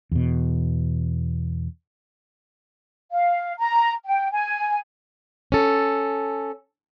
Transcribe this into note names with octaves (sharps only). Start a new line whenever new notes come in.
E2 B2
F5
A#5
G5
G#5
C#4 A4